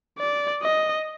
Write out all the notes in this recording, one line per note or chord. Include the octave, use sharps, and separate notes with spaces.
D5
D#5